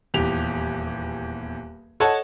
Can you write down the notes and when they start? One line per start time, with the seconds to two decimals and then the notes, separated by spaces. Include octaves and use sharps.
0.14 D#1 E2 G4 F7
2.00 A4 C#5 D#5 F#5 A5